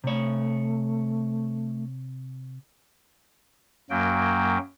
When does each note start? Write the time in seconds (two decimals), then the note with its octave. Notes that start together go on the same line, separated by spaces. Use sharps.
0.04 C3 A3 C#5
3.90 F#2 F#3 A#3 G5